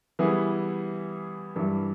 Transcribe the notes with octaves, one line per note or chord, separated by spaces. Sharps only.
E3 G3 B3 E4 G#4
G2 E3 G3